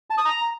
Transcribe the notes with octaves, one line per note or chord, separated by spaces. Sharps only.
A5
D#6
A#5